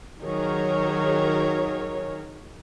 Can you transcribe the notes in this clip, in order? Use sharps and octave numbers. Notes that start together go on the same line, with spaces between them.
D#3 F#3 G#4 A#4 C#5